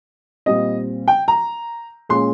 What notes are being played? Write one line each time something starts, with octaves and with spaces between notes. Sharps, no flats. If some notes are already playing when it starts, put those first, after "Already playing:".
A#2 G3 C4 D#5
G5
A#5
A#2 G#3 C#4 C6